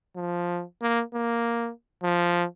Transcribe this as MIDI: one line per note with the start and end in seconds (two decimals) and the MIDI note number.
0.16 0.63 53
0.82 1.03 58
1.14 1.71 58
2.03 2.45 53